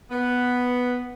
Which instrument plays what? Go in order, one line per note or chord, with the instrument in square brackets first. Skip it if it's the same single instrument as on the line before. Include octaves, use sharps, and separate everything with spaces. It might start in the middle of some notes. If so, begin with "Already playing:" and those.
[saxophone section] B3